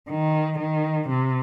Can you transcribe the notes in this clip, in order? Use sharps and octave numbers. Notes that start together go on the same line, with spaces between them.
D#3
D#3
C3